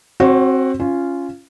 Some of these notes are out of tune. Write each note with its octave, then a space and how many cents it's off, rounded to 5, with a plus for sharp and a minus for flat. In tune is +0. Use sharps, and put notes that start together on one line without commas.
C4 +20 F#4 +5 C#5 -30
C#4 +0 F4 -10